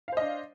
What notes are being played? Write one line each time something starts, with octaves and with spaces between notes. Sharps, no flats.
D4 C5 D#5 F5